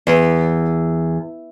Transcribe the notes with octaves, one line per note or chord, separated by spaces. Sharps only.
E2